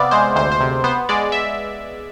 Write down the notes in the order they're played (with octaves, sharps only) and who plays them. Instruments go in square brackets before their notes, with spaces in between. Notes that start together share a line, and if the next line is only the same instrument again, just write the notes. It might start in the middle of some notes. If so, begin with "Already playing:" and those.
Already playing: [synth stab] C3 B3 D5 E5 F5
G#3 C5
D2 C5
C5
C3
B3 C5
G#3 D5
E5